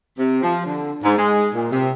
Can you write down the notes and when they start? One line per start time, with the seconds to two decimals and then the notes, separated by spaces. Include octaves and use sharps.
0.19 C3
0.43 F3
0.65 D3
1.03 G#2
1.17 G#3
1.53 A#2
1.72 C3